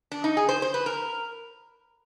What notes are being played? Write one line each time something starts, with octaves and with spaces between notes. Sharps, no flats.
D4
D#4
G#4
C5
C5
B4
A#4